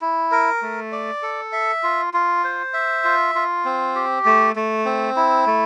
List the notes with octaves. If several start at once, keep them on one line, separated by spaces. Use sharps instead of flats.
E4
A#4
A3
D5
A4
E5
F4
F4
C5
E5
F4
F4
C4
G4
A3
A3
C4
E4
A3